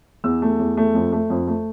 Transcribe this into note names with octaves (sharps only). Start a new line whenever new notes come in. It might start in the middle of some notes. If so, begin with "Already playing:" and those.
E2 E6
A3
E2
A3
F2
A3
F2
A3